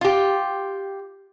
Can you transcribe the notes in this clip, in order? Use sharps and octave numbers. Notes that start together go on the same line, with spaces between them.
F4 G4